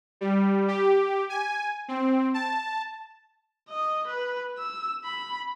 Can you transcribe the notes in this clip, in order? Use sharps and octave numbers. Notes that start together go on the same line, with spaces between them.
G3
G4
G#5
C4
A5
D#5
B4
E6
B5